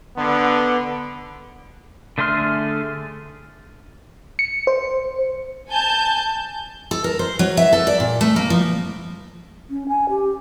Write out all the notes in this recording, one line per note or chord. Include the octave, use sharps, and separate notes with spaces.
D3 B3
D3 A3 G#4 C6 F6
C#7
C5
G#5 A5 G6
A4
A#4
C5
F#3
E5
A4
D5
A#2
A3
A#3
F3
C#4
G#5
G4